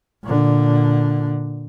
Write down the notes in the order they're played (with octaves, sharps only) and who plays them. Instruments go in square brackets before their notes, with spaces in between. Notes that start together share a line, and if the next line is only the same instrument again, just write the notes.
[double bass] A#2 D3